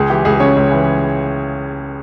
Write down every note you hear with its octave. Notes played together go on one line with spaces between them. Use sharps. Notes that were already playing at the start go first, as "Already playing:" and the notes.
Already playing: C#2 G#4
E3 G4
C#2 G#4
C#3 C#5
C#2
E3